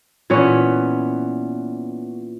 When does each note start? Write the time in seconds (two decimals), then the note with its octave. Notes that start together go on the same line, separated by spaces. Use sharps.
0.30 A#2 E3 B3 C#4